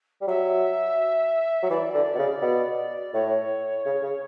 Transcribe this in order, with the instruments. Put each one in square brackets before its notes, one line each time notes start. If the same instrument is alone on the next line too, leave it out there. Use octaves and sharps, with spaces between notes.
[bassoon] G3
[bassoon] F#3 [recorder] E5
[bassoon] F#3
[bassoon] E3 [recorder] D5
[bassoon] D3
B2
C#3
B2
[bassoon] A2 [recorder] C#5
[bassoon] C#3
C#3